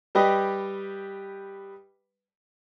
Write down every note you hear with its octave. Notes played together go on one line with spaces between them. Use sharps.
G3 G4 B4 D#5